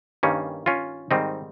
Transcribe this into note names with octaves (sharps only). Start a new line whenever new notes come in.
G2 D#3 G3 A#3 C#4
C#4 F4
G#2 D#3 G3 C4 D#4